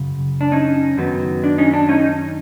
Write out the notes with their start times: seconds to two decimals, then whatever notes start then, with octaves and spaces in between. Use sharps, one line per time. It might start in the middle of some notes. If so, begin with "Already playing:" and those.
Already playing: F#2 C#3
0.41 D4
0.52 C#4 D#4
0.97 F#2 D#3 F#3 B3
1.44 D4
1.58 C#4 D#4
1.73 D4
1.89 C#4 D#4